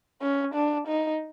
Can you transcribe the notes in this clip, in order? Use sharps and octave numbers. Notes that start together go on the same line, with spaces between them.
C#4
D4
D#4